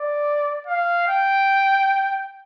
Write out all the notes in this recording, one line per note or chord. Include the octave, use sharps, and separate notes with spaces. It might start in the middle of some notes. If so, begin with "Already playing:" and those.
Already playing: D5
F5
G5